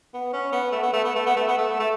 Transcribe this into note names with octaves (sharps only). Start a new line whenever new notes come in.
B3
C#4
B3
A3
B3
A3
B3
A3
B3
A3
B3
A3
A3